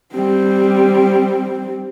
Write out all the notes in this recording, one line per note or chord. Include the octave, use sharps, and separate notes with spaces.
G3 C4